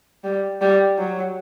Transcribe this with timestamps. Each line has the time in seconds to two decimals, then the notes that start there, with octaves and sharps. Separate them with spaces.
0.24 G3
0.61 G3
0.98 F#3